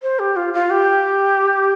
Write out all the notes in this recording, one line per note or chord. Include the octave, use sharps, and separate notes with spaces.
C5
G4
F4
F4
G4